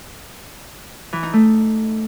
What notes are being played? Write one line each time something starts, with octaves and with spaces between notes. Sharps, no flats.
E3
D#4
A3